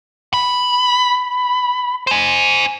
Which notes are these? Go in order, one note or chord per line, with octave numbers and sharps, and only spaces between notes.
B5
C5 G#5